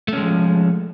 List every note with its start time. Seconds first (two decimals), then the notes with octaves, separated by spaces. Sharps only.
0.08 A3
0.13 C#4
0.17 G#3
0.22 F3